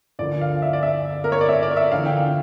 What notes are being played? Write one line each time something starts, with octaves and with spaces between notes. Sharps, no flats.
D2 D3 F3 A#3 D5
F5
E5
D5
E5
A#4
C#5
D5
E5
D5
E5
E2 D3 F3 F5
G5
F5